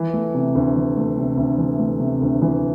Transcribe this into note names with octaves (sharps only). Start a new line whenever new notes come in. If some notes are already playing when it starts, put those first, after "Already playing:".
Already playing: E3
A3
C3
D2
E3
A3
C3
D2
E3
A3
C3
D2
E3